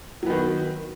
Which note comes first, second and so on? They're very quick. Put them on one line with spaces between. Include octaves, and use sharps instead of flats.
F#3 B3 D#3